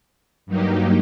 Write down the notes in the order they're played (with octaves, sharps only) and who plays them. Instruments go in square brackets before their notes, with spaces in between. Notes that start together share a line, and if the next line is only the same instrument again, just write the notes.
[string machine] G2 F#3 A#3 D#4 G4